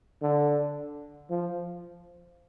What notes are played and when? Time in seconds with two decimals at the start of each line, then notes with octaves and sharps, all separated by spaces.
0.22 D3
1.30 F3